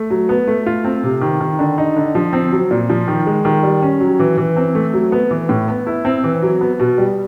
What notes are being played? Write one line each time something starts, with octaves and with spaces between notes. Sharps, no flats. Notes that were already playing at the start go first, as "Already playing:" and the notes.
Already playing: A3
F#3
B3
A3
F4
C4
C3
D#3
D#3
D3
D#4
D3
F3
C4
F#3
A#2
F3
D#3
G#3
D#3
G3
C#4
F#3
E3
E3
C4
A3
F#3
B3
E3
A2
B3
E4
C4
E3
F#3
B3
B2
G3